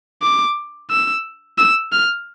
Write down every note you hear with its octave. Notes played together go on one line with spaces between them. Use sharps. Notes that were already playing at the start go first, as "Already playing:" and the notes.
D6
E6
E6
F6